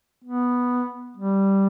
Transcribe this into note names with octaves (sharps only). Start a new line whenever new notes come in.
B3
G3